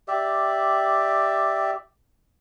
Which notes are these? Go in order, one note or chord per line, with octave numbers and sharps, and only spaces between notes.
G4 D5 E5